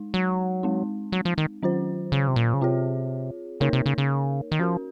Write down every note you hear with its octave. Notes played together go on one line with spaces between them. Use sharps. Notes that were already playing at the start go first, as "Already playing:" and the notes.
Already playing: G#3 D#4
F#3
G#3 C4 D#4
F#3
F3
D#3
D#3 F#3 C#4 F4 C5
C#3
C3
A#2
C#3
C3 C4 F4 G#4 C#5
C#3 A#3 D#4 A#4 C#5
C3
C#3
C#3
D#3
F3 C#4 F#4 A#4